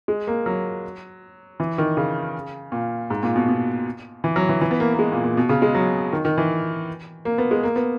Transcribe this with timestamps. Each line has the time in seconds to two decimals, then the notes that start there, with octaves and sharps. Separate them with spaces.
0.08 G#3
0.27 A#3
0.46 F#3
1.60 E3
1.78 D#3
1.97 C#3
2.72 A#2
3.10 G#2
3.23 A#2
3.36 B2
3.48 B2
4.24 E3
4.36 F#3
4.49 E3
4.61 E3
4.71 B3
4.80 A#3
4.94 A#3
4.99 G#3
5.12 A#2
5.24 A#2
5.37 B2
5.49 C#3
5.62 G#3
5.75 F#3
6.13 D#3
6.25 D#3
6.38 E3
7.25 A#3
7.38 B3
7.51 G#3
7.63 A#3
7.76 B3